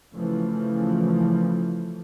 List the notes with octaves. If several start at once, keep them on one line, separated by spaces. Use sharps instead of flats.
C#3 E3 F3 A3